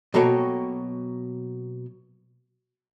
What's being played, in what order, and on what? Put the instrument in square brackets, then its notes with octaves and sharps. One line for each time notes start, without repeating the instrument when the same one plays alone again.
[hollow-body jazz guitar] B2 F#3 A#3 A4 C#5 G5